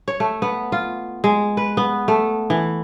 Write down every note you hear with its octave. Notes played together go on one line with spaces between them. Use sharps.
C#5
A3
B3
F4
G#3
B4
B3
A3
E3